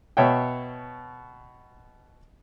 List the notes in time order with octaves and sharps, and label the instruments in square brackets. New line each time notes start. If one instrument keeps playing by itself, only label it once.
[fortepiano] B2 C#5 E5 G5